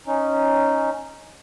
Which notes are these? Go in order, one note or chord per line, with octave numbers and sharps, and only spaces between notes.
C#4 D#4